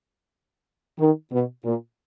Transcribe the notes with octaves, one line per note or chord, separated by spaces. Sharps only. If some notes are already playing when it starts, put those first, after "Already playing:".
D#3
B2
A#2